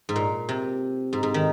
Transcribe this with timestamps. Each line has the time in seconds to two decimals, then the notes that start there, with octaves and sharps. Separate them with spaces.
0.09 G#2
0.16 A#2
0.49 C3
1.13 G#2
1.23 G#2
1.34 D#3